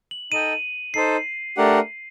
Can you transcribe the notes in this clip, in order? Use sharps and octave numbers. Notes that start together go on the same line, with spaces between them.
F#7
D#4 A4 D#5 G5 D#7
D#4 A4 C5 C7
A3 D4 G4 A#4 F#5